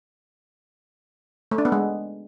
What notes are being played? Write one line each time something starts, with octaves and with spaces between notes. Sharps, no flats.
A3
D4
B3
G#3